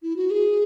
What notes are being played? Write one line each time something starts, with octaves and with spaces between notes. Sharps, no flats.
E4
F#4
G#4